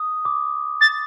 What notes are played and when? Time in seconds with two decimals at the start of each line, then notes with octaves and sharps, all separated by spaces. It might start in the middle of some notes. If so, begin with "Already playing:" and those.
Already playing: D#6
0.25 D6
0.81 A6